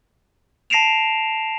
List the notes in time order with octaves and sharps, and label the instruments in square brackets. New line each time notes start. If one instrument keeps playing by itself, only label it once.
[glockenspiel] A5 A#6 C7 D7 E7 F7